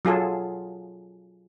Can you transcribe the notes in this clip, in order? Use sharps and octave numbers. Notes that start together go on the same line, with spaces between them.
F#3 F4 G#4 A4